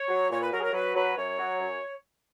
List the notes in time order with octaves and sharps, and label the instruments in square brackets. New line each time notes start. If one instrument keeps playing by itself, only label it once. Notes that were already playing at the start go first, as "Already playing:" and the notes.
Already playing: [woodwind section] C#5
F#3
A#2 C#5
B4
F#3 A#4
G#4
A#4
F#3 B4
F#3 B4
F#2 C#5
F#3
F#2